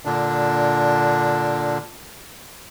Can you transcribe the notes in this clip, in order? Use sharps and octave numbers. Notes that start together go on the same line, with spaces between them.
A#2 D3 D4